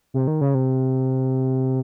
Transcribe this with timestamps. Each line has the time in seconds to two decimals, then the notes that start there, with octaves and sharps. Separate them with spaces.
0.14 C3
0.27 D#3
0.41 C#3
0.55 C3